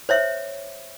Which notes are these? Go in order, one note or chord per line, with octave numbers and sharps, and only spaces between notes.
C5 C#5 E5